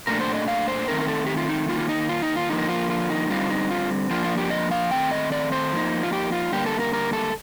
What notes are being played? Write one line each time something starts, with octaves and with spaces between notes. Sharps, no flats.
A#2 A3 D4 A#4
C5
D#5
F5
C5
D#3 A3 C4 D#4 A#4
A#4
A4
G4
F4
D#4
D#3 A#3 D#4 F4
F4
D#4
F4
D#4
F4
D3 F3 A#3 D#4
F4
F4
D#4
D3 G3 C4 D#4 F4
D#4
F4
F3 A#3 D4 F4
F4
G4
D#5
F5
D#3 A3 C4 G5
D#5
D5
C5
F3 A#3 D#4
F4
G4
F4
D3 G3 A#3 G4
A4
A#4
A#4
A4